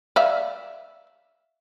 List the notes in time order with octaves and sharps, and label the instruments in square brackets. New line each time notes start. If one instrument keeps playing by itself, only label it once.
[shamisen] D5 E5 F5